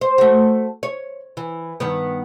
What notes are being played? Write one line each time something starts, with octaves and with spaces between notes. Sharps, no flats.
C5
A3 F#4
C#5
E3
G2 D#3 B3